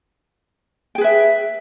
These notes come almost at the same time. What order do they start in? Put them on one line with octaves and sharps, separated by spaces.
G5 G#4 B4 E5